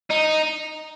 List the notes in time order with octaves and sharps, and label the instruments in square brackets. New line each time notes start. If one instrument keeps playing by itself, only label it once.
[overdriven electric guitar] D#4